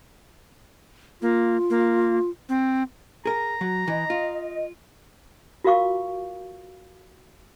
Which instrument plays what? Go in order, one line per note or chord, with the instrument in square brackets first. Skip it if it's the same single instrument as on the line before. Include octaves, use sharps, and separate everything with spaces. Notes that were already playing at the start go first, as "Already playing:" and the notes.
[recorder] A#3 [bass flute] F4
[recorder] A#3
C4
[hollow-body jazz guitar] G#4 A#4 [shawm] A#5
[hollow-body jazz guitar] F#3
[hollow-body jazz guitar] E3 [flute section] D#5
[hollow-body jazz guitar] F4
[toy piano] F4 F#4 A#4 F5 C#6 D6